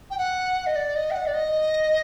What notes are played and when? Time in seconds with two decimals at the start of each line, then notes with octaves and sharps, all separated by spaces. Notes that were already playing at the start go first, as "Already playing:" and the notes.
0.10 G5
0.18 F#5
0.66 D#5
0.75 D5
0.96 D#5
1.11 G5
1.14 F#5
1.26 D5
1.34 D#5